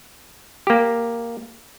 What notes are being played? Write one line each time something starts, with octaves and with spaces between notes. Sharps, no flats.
A#3 G4